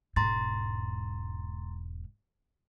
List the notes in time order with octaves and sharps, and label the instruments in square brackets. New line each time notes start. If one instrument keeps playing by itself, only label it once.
[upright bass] E1 G#2 [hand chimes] A#5 C6 A6